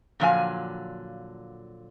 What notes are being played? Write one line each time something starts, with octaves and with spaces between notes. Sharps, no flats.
A#2 D3 F3 F#3 F5 G#5